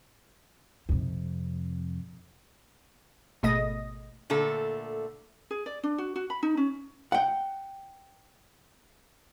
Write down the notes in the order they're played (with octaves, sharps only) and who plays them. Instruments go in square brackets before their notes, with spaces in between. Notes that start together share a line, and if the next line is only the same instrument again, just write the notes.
[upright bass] F2 C3
[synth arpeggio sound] G#1 B2 A3 D#5 D#6 A#6
[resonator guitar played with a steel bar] A#2 D3 A3 A4
[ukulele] G#4
D5
D4
F#4
F#4
B5
D#4
C#4
[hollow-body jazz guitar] F#5 G5